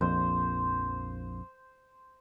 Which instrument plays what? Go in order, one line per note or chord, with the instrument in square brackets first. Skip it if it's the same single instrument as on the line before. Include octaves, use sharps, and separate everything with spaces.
[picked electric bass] A#1 F2 [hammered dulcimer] C5